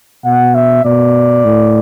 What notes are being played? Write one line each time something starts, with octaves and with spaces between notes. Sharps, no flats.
B2 F#5
E5
B2 D5
A2